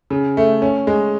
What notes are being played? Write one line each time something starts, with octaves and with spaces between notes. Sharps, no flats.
C#3
A3
C#4
G#3